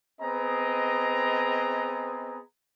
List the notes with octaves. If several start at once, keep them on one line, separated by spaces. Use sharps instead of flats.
B3 C4 G#4 B4 D#5 A#5